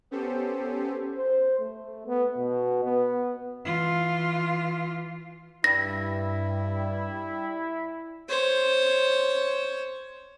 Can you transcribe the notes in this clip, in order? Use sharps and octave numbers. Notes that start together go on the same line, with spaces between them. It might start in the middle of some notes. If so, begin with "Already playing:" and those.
B3 C#4 G4 A4 C5
C5
A3
B3
B2
B3
E3 F4
G2 G3 E4 A#6
C5 C#5